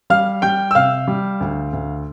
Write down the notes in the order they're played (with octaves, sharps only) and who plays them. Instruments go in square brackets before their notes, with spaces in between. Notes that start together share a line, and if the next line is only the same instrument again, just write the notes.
[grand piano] G3 F5 F6
G3 G5 G6
E6
C3 F5 F6
G3
D2
D2